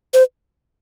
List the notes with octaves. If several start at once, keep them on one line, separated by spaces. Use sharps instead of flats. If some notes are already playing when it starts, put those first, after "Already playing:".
C5